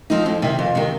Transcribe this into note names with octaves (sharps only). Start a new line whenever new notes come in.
F3 C4 D#4
F2
C3 D#3
F2
C3 D#3